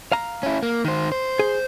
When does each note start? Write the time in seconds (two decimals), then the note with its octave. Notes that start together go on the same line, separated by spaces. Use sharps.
0.12 F5 A#5
0.43 C#4 E4
0.63 A#3
0.85 D#3 C5
1.12 C5
1.39 G#4